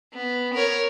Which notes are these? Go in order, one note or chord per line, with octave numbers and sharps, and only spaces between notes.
B3
A#4 C#5